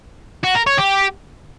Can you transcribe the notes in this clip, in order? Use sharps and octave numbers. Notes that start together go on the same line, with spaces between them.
F#4
A#4
C#5
G4